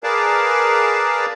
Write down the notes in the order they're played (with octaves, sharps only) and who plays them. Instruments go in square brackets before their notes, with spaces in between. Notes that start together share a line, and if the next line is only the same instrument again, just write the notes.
[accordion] G#4 A#4 B4 D5 F5 A5